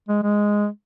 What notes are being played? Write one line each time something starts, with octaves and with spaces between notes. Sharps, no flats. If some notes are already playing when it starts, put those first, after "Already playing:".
G#3
G#3